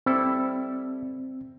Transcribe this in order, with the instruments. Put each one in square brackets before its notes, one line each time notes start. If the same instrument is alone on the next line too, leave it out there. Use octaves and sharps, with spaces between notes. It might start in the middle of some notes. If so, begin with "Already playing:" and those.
[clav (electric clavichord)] G3 E4 A4 [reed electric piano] C4